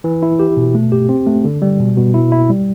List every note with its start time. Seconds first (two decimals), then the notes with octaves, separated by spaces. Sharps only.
0.04 E3
0.23 E4
0.39 G4
0.57 B2
0.75 A3
0.92 G4
1.09 C4
1.27 A3
1.44 D3
1.62 G3
1.79 B2
1.97 B2
2.14 E4
2.32 E4
2.50 G3